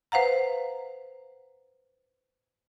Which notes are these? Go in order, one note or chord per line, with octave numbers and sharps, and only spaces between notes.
B4 C5 F5 F#5 A#5